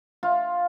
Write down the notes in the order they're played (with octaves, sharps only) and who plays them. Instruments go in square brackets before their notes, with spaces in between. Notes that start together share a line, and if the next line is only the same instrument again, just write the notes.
[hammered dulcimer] F4